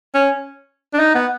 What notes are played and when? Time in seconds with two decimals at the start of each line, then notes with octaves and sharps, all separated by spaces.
0.14 C#4
0.93 D4
0.99 D#4
1.15 B3